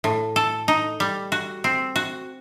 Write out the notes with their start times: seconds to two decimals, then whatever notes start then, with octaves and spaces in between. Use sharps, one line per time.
0.04 A2
0.36 A4
0.68 D#4
1.00 G3
1.32 F#4
1.64 C4
1.96 F#4